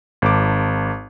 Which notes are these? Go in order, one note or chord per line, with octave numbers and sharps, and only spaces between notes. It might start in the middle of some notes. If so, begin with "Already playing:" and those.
G#1 D6